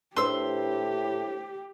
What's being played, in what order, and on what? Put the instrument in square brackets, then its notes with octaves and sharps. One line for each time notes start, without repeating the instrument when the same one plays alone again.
[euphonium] A2 [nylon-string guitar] D4 B4 C5 [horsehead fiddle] G4 [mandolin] C6 E6